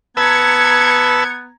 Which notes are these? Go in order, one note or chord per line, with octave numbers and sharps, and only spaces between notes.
B3 B4 A5 A#5 E6 G#6 C#7